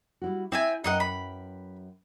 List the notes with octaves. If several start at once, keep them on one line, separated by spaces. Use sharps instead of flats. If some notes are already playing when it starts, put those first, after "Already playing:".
G3 E4 F#4
C4 E4 E5 G#5
F#2 D#4 B4 D#5 F#5 G5
B5